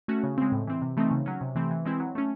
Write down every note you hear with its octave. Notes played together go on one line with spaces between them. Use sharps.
A3 C#4 F#4
C#3
G#3 C4
A2
E3 C4
C3
E3 A3 C4 D#4
C#3
F#3 C#4
C3
E3 A3 C4
E3
G#3 C4 E4
F#3
A3 C#4